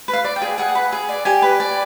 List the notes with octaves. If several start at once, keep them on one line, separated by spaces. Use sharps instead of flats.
B4
F5
D5
G5
G#4
G#4 F#5
B4
G#4
D5
G4 G#5
B4
D5